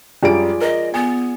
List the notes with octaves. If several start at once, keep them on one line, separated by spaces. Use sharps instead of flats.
F#2 G3 F4 G#4 D5 D7
A#4 D#5
B3 G#5